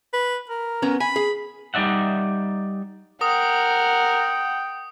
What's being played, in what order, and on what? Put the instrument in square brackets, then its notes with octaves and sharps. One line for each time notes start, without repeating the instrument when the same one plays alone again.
[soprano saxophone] B4
A#4
[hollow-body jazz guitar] B3 C#4 A#5
[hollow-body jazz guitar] G#5 [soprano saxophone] B5
[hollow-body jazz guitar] G#4
[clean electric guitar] G3 D#4 D5 E5 F#5
[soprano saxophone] A#4 [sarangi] F#5 [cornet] G5 [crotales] D#6